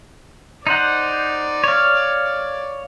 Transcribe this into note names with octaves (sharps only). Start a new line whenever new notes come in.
D#4 C5 D5 F#5
C#5 F5